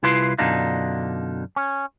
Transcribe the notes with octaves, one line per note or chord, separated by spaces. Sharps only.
C2 E4 F4 B4 C6
F#2 B2 D3 D4 D#4 F4
C#4